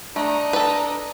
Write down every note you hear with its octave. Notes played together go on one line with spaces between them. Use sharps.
A3 D4 D#4 D#5 A#5
A4 B4